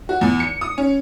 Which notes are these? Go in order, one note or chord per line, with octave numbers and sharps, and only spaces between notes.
F#4
E2
C#7
D#6
C#4